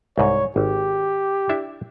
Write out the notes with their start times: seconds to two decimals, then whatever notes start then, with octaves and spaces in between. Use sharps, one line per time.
0.18 C2 G#2 C#5
0.56 G#1 G4
1.49 D4 E4 E5